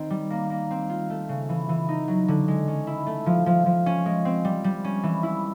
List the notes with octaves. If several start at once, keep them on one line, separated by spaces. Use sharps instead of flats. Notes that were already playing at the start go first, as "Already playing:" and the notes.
Already playing: D#3 C4
G3
A#3
A#3
C4
F4
A3
C#3
E3
E3
D#4
F#3
D3
G#3
C#4
E4
A3
F3
F3
F3
C#4
G#3
C4
G3
G3
C#4
E3
E4